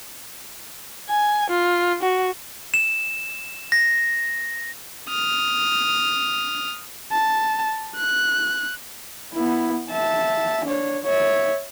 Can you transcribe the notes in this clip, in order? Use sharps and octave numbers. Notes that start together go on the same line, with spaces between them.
G#5
F4
F#4
E7
A#6
D#6 F6
A5
F#6
B3 E4
E5 A5
D4 C#5
C#5 E5